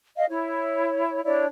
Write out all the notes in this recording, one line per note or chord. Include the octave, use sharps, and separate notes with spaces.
D#5 F5
E4 C#5
D4 E4 C#5 D5